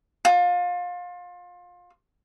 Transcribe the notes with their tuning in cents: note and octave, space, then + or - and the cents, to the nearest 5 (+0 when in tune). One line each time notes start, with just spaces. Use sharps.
F4 +25